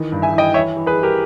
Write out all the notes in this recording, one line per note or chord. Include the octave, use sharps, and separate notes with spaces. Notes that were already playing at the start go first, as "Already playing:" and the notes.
Already playing: D#3 E3
G2
E5 G#5
E3
D#5 G5
E3 C#5 E5
E3
G#4 B4
E3
G4 A#4